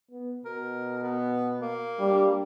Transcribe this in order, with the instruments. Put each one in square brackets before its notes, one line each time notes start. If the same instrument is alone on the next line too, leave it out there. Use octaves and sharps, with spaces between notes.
[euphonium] B3
[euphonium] B2 [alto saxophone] A#4
[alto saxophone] B3
A#3
[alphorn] G3 [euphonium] D4